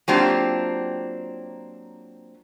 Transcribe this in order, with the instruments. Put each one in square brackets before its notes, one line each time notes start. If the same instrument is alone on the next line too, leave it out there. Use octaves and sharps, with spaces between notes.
[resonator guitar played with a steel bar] F#3 A#3 C4 D4 F4 G4